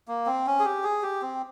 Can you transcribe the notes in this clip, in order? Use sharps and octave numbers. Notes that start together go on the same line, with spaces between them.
A#3
C4
C#4
G#4
G4
G#4
G4
C4